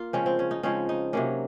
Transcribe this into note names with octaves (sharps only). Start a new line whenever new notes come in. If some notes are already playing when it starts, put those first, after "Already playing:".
Already playing: A#3 F4
C#3 F3 G#3 C4 C#4
C4
C#4
D#4
C#3 F3 G#3 C4 C#4
D#4
C3 F#3 A#3 C#4